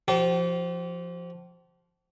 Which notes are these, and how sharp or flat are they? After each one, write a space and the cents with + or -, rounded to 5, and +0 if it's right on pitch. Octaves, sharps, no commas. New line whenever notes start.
F3 +0 G4 -40